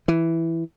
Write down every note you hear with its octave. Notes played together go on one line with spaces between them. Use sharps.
E3